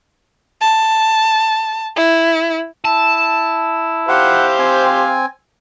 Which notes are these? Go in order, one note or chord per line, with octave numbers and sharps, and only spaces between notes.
A5
E4
E4 A5
G4 C5 F5 F#5
C4 G#5